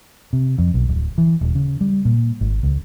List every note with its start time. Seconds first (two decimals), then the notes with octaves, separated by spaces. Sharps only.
0.33 C3
0.58 F2
0.74 B1
0.89 D1
1.18 E3
1.41 D#1
1.55 C#3
1.81 G3
2.05 A#2
2.41 G#1
2.63 C#2